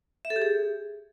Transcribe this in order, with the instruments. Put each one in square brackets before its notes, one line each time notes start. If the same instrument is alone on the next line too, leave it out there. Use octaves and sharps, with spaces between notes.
[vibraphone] E5
A4
G4
G#4